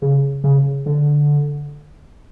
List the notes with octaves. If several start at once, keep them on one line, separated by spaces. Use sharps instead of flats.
C#3
C#3
D3